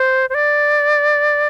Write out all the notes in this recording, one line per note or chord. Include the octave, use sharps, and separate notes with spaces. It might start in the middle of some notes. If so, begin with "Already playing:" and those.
Already playing: C5
C5
D5